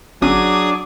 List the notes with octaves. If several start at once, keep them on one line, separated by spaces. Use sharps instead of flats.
G1 F#3 C#4 D4 G#4 D6 D#6